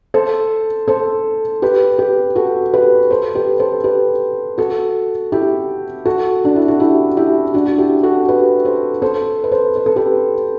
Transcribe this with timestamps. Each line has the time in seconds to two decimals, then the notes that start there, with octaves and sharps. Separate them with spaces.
0.14 A4 C5
0.88 A4 C5
1.62 G4 B4
1.99 G4 B4
2.35 F#4 A4
2.73 G4 B4
3.10 A4 C5
3.35 G4 B4
3.59 A4 C5
3.84 G4 B4
4.58 F#4 A4
5.32 E4 G4
6.05 F#4 A4
6.45 D4
6.56 E4
6.68 F#4
6.80 E4 G4
7.17 E4 G4
7.54 D4 F#4
7.67 F#4
7.78 E4 G4
8.03 F#4 A4
8.28 G4 B4
8.65 A4 C5
9.02 A4 C5
9.44 B4
9.51 A4 C5
9.76 B4
9.86 A4
9.96 G4 B4